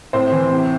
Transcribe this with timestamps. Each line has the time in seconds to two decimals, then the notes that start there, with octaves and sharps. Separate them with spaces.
0.13 A2 C4 C5
0.32 E3
0.51 C3